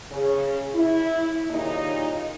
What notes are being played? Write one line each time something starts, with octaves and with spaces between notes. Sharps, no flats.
C#3
E4
D#2 A#2 C#3 D#4